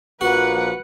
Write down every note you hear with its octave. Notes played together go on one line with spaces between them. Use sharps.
A#1 F3 A#3 F#4 B4 F#5